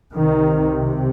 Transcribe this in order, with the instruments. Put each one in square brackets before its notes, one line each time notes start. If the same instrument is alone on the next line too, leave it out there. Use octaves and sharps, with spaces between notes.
[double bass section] C2 C3 D#3